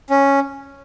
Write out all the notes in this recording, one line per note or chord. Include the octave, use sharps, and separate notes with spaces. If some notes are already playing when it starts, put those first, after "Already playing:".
C#4